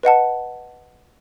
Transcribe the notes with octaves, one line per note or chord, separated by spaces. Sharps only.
B4 D#5 F#5 A5